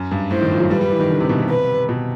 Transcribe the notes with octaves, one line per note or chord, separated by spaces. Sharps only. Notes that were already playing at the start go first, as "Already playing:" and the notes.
Already playing: F#2
G2
A2 C5
D#3
F3
F#3
G3 B4
G3
E3
D#3
D3
C3
B2
C3
B4
B2